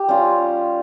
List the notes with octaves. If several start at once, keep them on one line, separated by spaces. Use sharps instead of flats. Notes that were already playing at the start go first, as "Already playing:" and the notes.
Already playing: G4
G3 C#4 F4